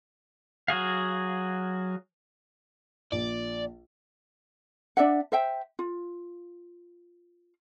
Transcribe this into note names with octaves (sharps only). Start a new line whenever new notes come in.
F#3 F#4 G#4 F5
A#1 D5
D4 D5 E5 F#5
C5 E5 G5
F4